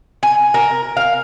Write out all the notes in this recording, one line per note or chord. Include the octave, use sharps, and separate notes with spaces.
G#5
A#4
F5